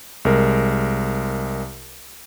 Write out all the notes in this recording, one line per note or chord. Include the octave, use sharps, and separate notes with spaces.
C2 G#3 A#4